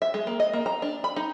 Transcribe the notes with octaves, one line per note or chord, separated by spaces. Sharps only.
E5
G#3
A#3
D#5
A#3
A#5
D4
B5
D#4